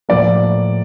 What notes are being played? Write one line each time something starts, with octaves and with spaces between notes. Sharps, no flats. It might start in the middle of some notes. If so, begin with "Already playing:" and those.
A2 F3 A#3 D5